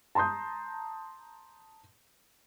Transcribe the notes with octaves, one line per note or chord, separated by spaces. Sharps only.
A5 A#5 C6 D#6 G6